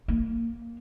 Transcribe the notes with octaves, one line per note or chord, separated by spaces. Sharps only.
A#3